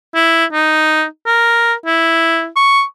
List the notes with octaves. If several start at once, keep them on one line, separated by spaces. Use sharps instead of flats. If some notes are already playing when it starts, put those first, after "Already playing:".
E4
D#4
A#4
E4
C#6